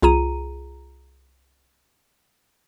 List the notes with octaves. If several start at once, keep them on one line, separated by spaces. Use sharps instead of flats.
C2 F4 G#4 A#5 D#7